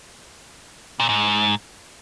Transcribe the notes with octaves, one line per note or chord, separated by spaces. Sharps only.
A#2
G#2